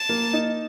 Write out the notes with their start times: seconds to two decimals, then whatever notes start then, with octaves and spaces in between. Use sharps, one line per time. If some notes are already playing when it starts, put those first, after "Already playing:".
Already playing: A5
0.09 A#3
0.33 D#4